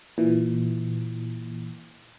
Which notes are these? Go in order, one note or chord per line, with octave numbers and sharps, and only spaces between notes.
A#2 E3